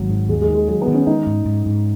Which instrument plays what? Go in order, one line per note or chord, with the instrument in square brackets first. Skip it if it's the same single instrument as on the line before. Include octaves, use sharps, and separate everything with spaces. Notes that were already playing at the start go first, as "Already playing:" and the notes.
Already playing: [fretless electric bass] G#1 [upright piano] F#3
[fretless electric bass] G#2
[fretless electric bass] D#2 [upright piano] G#3
[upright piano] G#3
[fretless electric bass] D#3
[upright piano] G#3
[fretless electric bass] F#3 [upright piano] G#3
[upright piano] B3
[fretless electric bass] D#3
[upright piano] C#4
[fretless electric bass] G#3 [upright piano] D#4
[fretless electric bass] G#2
G#2
G#2